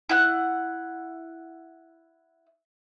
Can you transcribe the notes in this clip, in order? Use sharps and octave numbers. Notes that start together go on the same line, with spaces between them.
E4 F#5 F#6